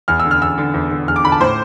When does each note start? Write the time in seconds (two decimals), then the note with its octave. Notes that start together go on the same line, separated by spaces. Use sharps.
0.08 E2 F6
0.20 E6
0.25 D3
0.31 F6
0.42 E2 E6
0.58 D3
0.74 E2
0.91 D3
1.08 E2 F6
1.16 D6
1.24 D3 B5
1.32 A5
1.40 A2 C5